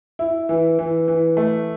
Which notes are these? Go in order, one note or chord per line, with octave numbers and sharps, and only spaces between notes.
E4
E3
E3
E3
A3